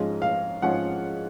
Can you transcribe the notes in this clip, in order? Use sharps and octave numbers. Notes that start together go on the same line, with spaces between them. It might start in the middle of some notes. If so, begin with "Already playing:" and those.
Already playing: G#2 F3 G#3 C#4 F4 D#5
F5
G#2 F3 G#3 C#4 F4 F#5